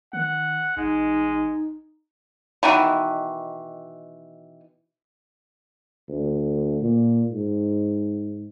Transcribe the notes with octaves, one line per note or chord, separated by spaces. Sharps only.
D#3 F#5
A1 G#3 D#4
B2 D#3 E3
D2
A#2
G#2